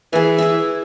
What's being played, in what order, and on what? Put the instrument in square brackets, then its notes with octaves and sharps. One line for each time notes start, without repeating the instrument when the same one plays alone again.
[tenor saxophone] E3 [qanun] G#4 G#5
[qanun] E4 G#4 E5